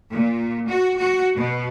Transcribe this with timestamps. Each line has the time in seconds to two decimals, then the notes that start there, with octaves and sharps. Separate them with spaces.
0.11 A#2
0.68 F#4
0.97 F#4
1.36 B2